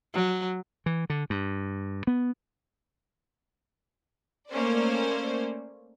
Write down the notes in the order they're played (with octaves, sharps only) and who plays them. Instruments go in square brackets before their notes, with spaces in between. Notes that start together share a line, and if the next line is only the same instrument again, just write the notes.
[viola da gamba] F#3
[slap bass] E3
D3
G2
B3
[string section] A3 A#3 C#4 C5 D5